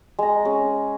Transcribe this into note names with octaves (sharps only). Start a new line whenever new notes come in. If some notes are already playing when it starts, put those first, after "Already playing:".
G#3 A#5
C#4 G#4